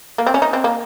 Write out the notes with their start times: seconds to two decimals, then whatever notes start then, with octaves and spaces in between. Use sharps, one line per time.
0.18 A#3
0.27 C4
0.34 C#4
0.42 D#4
0.53 C4
0.64 A#3